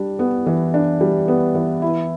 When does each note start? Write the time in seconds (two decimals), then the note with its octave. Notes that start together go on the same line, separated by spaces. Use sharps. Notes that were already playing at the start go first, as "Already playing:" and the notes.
Already playing: G3 D4
0.19 B3
0.46 E3
0.74 D4
1.01 G3
1.28 B3
1.55 E3
1.82 E4